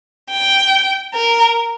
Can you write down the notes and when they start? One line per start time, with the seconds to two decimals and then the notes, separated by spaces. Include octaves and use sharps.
0.31 G5
1.15 A#4